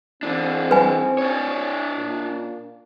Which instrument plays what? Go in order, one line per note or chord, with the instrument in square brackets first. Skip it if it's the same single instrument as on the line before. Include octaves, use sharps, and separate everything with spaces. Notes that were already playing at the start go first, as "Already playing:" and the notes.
[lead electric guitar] E3 D4 [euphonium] C4
[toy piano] B4 G#5
[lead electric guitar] D4 C#5
[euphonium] A#2